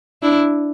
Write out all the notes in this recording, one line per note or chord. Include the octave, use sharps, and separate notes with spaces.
D4 E4